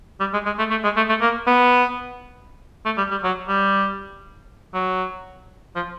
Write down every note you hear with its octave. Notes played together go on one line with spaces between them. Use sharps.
G3
G#3
G#3
A3
A3
G#3
A3
A3
A#3
B3
A3
G3
G3
F#3
G3
F#3
F3